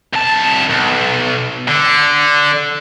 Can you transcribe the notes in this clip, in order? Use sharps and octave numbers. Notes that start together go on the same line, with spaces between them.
C2 A5
B1
D3